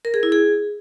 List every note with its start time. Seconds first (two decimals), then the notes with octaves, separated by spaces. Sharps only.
0.05 A#4
0.14 G#4
0.23 E4
0.32 G#4